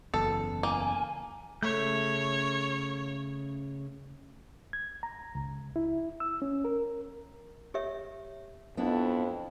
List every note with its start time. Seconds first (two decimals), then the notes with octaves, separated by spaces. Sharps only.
0.14 F#1 E2 A4
0.63 A#3 G#5
1.63 C#3 A3 C#5 E5 G6
4.73 G#6
5.03 A#5
5.35 C#2
5.76 E4
6.20 E6
6.42 C#4
6.65 A#4
7.74 G4 C#5 E5
8.77 F2 B3 D4 E4